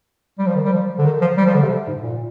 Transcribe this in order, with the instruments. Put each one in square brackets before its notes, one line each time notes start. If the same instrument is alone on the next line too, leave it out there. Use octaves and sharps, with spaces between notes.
[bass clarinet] G3
F3
D#3
G3
F3
D3
D#3
F3
G3
F3
D3
C3
G#2
A#2